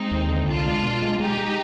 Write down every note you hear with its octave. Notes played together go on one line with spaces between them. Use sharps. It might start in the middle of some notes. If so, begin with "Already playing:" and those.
Already playing: G#3 C4 D#4
D#2
D3
C2 D4 F4
G#3
B2
G#3
G#3 D#4 G4
G#3